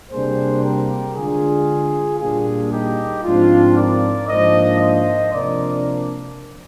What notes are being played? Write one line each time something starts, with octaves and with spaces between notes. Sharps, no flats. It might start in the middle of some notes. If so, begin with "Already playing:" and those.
C3 G3 A#3 D4 G#4 C5
G4 A#4
D3 G#3 D4 F4 G#4
A#2 G3 A#3 D4 F4 G#4
D#4 G4
G#2 F3 C4 D4 F4
A#4 D5
G#2 F3 A#3 D4 C5 D#5
C5 D#5
C3 F3 A#3 D4 A#4 D5